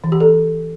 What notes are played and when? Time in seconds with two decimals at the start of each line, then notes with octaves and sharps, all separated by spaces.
0.04 E3
0.12 G4
0.20 A4